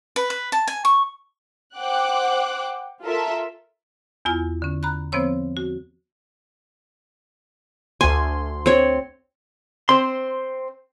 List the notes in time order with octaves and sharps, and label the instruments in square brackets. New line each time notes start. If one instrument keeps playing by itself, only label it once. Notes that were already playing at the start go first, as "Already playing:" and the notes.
[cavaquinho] B4
B4
A5
G#5
C#6
[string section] C5 F#5 G5 D6 F#6
F4 A4 A#4 E5
[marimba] E2 B3 E4 F4 G#5 F6
D3 C#4
A#5 B5 F#6
F3 B3 C4 C5 C#5 E6
F#4
[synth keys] D2 C6 [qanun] G#5
[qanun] C4 C#5
[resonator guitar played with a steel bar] C4 C5 [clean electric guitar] C6